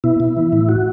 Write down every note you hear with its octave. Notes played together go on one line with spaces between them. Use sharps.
B2 E4
B2
E3
A2
F#4